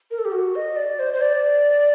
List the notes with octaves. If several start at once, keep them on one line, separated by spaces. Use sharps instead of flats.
A#4
A4
G4
F#4
D#5
D5
C5
C5
D5